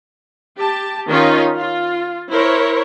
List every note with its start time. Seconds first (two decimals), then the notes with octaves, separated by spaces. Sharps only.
0.58 G4 A5
1.08 D#3 C#4 D#4 F4
1.57 F4
2.30 E4 A#4 C5 C#5